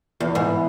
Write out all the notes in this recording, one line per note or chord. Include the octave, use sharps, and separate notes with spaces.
E2 E3 B3 E4
G#2